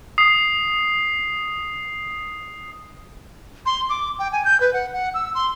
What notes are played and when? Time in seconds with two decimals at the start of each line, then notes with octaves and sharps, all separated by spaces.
0.18 D#6 C7
3.66 C6
3.89 D6
4.19 G5
4.32 G#5
4.45 G6
4.60 B4
4.73 F#5
4.94 F#5
5.14 E6
5.35 C6